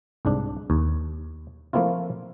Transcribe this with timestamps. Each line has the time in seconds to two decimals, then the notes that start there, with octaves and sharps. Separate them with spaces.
0.25 C2 G#2 D4
0.70 D#2
1.73 F3 A3 A#3 C4 E4 F4